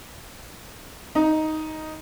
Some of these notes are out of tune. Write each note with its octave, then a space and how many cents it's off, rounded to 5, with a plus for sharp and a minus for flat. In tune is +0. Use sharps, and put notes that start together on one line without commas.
D#4 +5